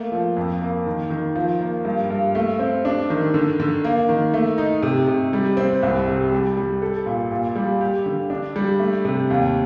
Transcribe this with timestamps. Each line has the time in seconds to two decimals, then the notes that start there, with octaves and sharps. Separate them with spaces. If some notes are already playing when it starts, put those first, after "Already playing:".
Already playing: A3 A#3
0.12 F3
0.37 F2
0.61 A#3
0.86 D#3
1.10 D#3
1.35 F3
1.61 A#3
1.85 G2
2.10 G2
2.35 A3
2.59 C4
2.85 D4
3.10 D#3
3.34 D3
3.60 D3
3.84 A#3
4.09 D#3
4.34 A3
4.58 D#4
4.83 C3
5.07 C3
5.33 G3
5.57 C4
5.83 C2
6.08 C3
6.32 G3
6.57 G3
6.82 A4
7.06 A#2
7.31 A#2
7.56 G3
7.81 G4
8.06 D3
8.30 D4
8.56 G3
8.79 A3
9.05 C3
9.30 D#2